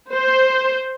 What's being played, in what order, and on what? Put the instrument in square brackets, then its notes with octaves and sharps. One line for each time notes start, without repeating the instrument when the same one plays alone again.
[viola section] C5